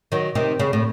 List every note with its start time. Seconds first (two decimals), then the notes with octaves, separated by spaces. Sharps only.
0.12 D#3 F#3
0.35 C3 D#3
0.59 C#3
0.73 A2